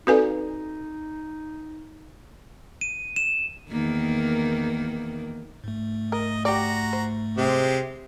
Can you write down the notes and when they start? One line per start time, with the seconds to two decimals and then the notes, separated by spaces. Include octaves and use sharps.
0.07 C4 D#4 F#4 A4 B4 D5 G#5
2.81 D#7
3.16 E7
3.71 E2 D#3 A#3
5.64 G#2 A3
6.12 A#4 D#5
6.45 F#4 G4 D5 A#5
6.93 C5
7.37 C3 G#3 C4 G4